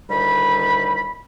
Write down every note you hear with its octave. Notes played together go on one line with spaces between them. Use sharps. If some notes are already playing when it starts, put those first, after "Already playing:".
D2 A2 D#3 G3 B5